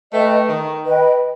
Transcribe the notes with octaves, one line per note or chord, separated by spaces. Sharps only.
A3 B4 D#5 G5
D#3
B4 D#5 G5